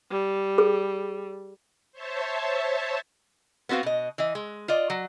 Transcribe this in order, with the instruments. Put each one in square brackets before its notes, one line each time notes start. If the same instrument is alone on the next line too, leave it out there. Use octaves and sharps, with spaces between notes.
[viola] G3
[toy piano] G#4
[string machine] C5 C#5 E5 A5
[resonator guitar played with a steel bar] B3 C4 F#4 B4 F5
B2 D#5
E3 D#5
G#3
F4 D5 D#5
F#3